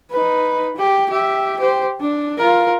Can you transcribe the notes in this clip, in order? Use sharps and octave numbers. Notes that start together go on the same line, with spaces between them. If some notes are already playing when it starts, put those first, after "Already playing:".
D#4 B4
G4
G4 E5
G4 C5
D4
F4 A#4